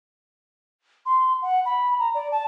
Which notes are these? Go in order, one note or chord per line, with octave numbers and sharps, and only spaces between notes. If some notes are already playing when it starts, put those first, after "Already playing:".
C6
F#5
B5
A#5
D5
A5